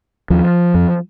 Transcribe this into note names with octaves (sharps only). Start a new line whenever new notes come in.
D#2 F3
F2